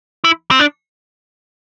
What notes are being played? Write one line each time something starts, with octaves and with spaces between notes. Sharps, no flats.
E4
C4
D4